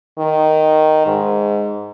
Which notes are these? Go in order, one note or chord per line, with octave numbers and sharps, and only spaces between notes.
D#3
G#2